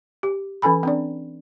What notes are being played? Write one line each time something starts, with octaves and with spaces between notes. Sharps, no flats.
G4
E3 C#4 A4 G#5 B5
C4 D4 D5